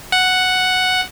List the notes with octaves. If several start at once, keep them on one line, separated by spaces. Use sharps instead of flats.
F#5